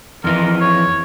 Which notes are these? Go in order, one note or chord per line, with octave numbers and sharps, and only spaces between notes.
F2 E3 A#4
C#5